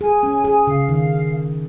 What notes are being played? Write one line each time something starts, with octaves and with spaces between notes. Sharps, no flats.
G#4 G#5
C#4
G#4 G#5
C#3 F5
D#3 F5